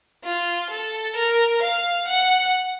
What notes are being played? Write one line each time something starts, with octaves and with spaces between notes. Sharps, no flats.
F4
A4
A#4
F5
F#5